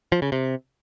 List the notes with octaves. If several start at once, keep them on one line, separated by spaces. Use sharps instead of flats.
F3
C#3
C3